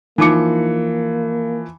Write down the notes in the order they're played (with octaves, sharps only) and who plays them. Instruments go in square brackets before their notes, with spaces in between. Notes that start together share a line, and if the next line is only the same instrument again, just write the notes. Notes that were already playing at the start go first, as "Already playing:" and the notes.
[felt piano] E3 F3 C#7 [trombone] A#3 [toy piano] D#4 A5 D6